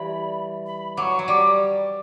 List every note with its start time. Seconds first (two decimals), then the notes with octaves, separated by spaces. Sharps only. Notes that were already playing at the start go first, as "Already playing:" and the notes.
Already playing: E3 G3 A3 B5
0.66 B5
0.97 F#3 C#6 D6
1.19 F#3
1.28 G3 D6